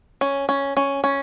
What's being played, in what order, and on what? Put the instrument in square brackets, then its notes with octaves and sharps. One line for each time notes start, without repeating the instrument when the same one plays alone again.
[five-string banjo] C#4
C#4
C#4
C#4